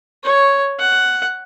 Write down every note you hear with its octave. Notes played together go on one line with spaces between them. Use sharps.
C#5
F#5